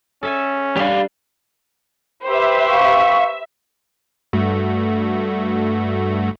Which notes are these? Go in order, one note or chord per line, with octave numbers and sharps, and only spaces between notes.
C#4 A4 E5 G#5
G3 D4 G4 F5
G4 B4 C5 E5
F5 C#6
G2 A3 F#4